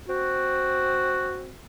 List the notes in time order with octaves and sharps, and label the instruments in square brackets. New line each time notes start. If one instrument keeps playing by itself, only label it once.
[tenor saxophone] C4 [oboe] F#4